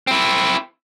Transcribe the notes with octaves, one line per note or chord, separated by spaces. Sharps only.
C4 E4